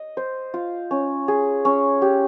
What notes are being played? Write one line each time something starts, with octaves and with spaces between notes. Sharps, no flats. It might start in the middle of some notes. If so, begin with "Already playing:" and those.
Already playing: D#5
C5
F4
C#4
G#4
C#4
G4